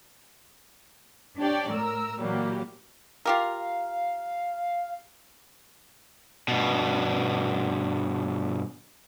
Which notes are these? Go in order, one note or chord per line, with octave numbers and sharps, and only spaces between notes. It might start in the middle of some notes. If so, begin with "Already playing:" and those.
D4 G4 C#5 D5 G5
A2 A#4 E6
A#2 E3 F#3 G3 A#3 G4
F4 G4 A#4 F5
G2 B2